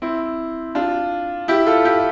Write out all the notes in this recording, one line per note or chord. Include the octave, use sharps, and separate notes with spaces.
C4 E4
D4 F4
E4 G4
F4 A4
E4 G4